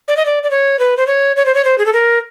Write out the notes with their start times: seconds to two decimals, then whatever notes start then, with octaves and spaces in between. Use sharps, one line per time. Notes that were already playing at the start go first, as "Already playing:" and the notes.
0.08 D5
0.17 D#5
0.26 D5
0.43 D5
0.51 C#5
0.79 B4
0.97 C5
1.07 C#5
1.36 C#5
1.46 C5
1.54 C#5
1.65 C5
1.78 G#4
1.86 A4
1.93 A#4